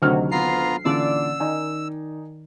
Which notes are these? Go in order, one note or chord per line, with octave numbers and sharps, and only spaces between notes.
D2 C3 D#3 F#3 F6
B3 F4 A#5 C7
A#2 D3 E3 C#4 D5 E6
D#3 D#4 D5 G#5